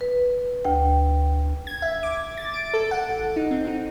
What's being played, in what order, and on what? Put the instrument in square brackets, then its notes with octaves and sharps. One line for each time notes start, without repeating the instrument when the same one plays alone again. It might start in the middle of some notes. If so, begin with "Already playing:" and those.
[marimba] B4
D2 G5
[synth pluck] G#6
E5
D6
A6
D7
A4
F#5
A1
D#4
C4
D#4